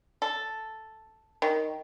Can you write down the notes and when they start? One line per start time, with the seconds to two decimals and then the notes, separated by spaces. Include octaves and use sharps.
0.22 A4
1.42 D#3